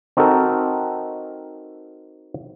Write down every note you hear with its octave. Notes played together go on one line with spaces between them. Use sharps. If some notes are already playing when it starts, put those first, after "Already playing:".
C4 D#4 F#4 A4 A#4